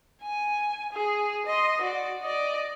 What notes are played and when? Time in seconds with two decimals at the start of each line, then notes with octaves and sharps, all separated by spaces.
0.22 G#5
0.93 G#4
1.47 D#5 C6
1.82 F#4 D5
2.22 D5 D#5